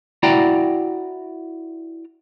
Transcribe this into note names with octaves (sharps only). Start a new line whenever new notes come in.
E4 F#4 D5 G5 A#5